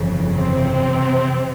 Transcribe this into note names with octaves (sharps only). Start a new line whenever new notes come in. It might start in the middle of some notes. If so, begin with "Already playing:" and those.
Already playing: G1 F2 C#3 E3
C3 C4